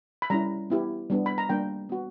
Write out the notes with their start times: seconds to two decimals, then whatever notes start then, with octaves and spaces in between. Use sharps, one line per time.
0.22 B5
0.30 G3 C#4 E4 A#5
0.70 B3 E4 G4
1.10 G3 B3 D4
1.26 B5
1.38 A#5
1.49 G3 A#3 D4 G5
1.89 B3 F#4